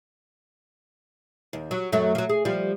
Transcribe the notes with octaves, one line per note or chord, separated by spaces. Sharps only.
D#2
F#3
F#2 F#3 A3
F3 F#3
G#4
F3 G3